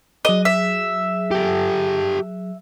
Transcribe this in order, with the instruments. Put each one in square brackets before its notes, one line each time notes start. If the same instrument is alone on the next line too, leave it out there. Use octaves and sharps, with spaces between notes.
[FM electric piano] F#3 G#4 [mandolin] D#5
[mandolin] E5
[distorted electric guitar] G4 A4